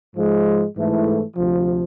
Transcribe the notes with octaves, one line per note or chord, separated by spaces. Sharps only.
G#2 F3 G#3
G#2 E3 A3 E4
D2 C3 F3